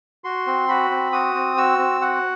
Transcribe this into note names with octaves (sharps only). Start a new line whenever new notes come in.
F#4 C6
C4
F#4 B5
C4
F#4 D#6
C4
F#4 E6
C4
F#4 F#5